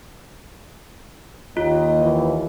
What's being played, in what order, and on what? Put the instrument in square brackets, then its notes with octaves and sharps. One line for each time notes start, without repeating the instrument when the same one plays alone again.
[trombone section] D#2 [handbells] F4 [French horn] D#5
[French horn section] E3